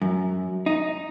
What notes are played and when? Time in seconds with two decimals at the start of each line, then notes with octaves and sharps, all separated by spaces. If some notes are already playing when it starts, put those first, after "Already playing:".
0.02 F#2
0.66 D#4